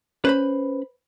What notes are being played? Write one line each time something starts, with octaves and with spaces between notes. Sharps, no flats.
C#4 B4 C5 B5